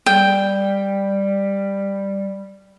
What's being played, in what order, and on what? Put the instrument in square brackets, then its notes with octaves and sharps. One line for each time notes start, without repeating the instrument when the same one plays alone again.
[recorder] G3 [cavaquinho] G5